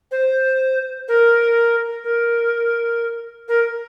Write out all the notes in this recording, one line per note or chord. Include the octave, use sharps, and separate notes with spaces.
C5
A#4
A#4
A#4